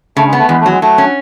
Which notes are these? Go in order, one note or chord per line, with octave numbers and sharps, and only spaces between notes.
C#3 A3
G#3
B3
A3
E2 G#3
A3
F#3
G#3
F#3 A3
C#4